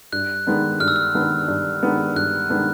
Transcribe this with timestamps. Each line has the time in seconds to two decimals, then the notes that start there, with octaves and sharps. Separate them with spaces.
0.13 G2 F#6
0.47 D#3 G#3 B3 D4
0.80 G2 F6
0.88 E6
0.96 F6
1.14 D#3 G#3 B3 D4
1.48 G2
1.82 D#3 G#3 B3 D4
2.16 G2 F#6
2.49 D#3 G#3 B3 D4